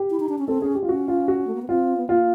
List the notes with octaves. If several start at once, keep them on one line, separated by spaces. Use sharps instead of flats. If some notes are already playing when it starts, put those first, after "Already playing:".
Already playing: G4
E4
D#4
D4
C#4
C4 A4
C#4 G#4
G4
F4
C#4 F#4
F4
F#4
A3
A#3
B3
C4 F4
B3
A#3 F4